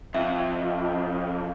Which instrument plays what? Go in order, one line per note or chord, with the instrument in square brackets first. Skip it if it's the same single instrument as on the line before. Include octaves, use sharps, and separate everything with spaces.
[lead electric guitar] F2 [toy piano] E5